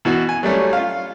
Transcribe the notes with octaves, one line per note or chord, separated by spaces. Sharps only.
B2 E3 F#4
G#5
F#3 G3 A3 C#4
F4 F5